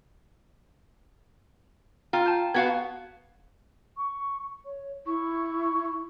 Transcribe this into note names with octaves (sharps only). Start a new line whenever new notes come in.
F4 G5 A#5 F6
G5 A5 G6
B3 F#4 F5 G#6
C#6
C#5
E4 C#6